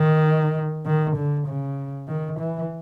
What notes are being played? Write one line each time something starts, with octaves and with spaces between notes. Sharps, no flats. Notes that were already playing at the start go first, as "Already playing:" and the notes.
Already playing: D#3
D#3
D3
C#3
D#3
E3